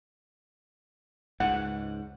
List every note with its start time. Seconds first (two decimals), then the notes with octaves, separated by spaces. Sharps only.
1.40 C#2 G#2 F#5